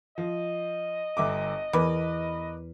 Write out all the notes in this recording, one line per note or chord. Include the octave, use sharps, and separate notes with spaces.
F3 D#5
G1 E5 D6
E2 A#4 B4 D6